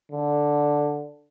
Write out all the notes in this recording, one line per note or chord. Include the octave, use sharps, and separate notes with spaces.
D3